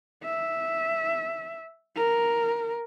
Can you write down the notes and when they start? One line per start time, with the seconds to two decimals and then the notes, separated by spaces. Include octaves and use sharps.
0.24 E5
1.96 A#4